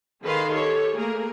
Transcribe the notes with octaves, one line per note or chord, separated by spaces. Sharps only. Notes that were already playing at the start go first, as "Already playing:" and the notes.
D3 D#3 G#4 B4 F5 C6
G4 A4 C#5
A3 A#3 G#4 A#4